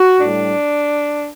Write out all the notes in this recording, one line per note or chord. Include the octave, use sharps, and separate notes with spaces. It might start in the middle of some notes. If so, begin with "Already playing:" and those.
Already playing: F#4
A2 G3 D4